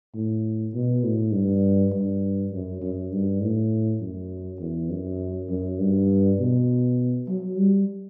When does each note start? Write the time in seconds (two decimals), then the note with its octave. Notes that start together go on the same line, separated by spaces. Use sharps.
0.14 A2
0.74 B2
1.04 A2
1.33 G2
1.93 G2
2.52 F#2
2.82 F#2
3.12 G2
3.41 A2
4.01 F#2
4.61 E2
4.90 F#2
5.50 F#2
5.80 G2
6.39 B2
7.29 F#3
7.58 G3